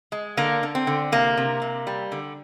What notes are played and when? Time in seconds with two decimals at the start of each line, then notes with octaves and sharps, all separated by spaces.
0.12 G#3
0.37 D3 A#3
0.63 D3
0.75 C4
0.87 D3
1.12 C3 A#3
1.37 C3
1.62 C3
1.87 G3
2.12 D3